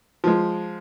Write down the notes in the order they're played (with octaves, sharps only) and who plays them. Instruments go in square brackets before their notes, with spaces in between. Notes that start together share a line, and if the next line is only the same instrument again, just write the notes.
[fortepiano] F3 G#3